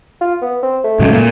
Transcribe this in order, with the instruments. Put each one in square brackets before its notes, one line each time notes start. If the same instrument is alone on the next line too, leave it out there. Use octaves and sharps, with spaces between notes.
[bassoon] F4
B3
C4
A3
[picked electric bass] G#2 C#3 F#3
A#2